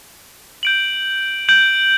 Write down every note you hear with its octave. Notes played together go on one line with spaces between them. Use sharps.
G6 D7 F#7
G6 D7 F#7